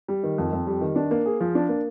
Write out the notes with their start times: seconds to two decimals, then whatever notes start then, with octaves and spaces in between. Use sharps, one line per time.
0.08 G3
0.23 D#3
0.38 F2
0.53 F2
0.67 G3
0.81 D#3
0.96 D4
1.11 A#3
1.26 G#4
1.40 F3
1.55 D4
1.69 A#3